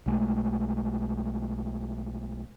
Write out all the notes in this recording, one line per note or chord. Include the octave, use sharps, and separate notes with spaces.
B1 G#3 A3